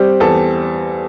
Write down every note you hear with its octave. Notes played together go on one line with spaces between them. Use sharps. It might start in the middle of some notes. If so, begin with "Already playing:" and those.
Already playing: G3 C4 G4
E2 A4